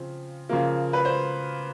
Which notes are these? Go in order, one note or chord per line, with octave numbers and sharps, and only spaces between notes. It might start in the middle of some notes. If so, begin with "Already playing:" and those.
Already playing: C#3 F3 C4
C#3 F3 A#3
B4
C5